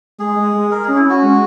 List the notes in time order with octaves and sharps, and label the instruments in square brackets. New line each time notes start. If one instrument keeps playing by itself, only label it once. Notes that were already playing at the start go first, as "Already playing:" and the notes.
[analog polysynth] G#3 [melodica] G#4
[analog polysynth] G#3
G#3
[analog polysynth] G#3 [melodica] A#4
[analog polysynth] C#4 [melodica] G#4
[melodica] E4
[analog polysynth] C#4 [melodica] F#4
[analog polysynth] G#3